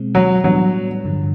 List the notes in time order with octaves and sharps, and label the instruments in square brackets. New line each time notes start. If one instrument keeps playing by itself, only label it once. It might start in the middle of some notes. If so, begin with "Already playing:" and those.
Already playing: [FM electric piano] B2 G#3 C4
[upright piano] F#3
[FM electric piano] A2 E3 G3 B3 D4 [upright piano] F#3
[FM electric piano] G2 D3 F3